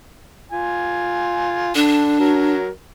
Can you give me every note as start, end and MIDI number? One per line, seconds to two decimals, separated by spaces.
0.52 1.72 65
0.52 1.72 80
1.75 2.15 50
1.75 2.55 62
2.20 2.69 54
2.20 2.69 70